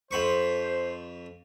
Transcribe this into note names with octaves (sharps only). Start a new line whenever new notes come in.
F2 C5 B5 C#6